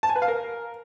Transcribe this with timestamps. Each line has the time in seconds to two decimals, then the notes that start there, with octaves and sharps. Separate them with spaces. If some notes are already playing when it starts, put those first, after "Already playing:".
0.03 A5
0.09 G#5
0.16 B4
0.22 F5
0.28 A#4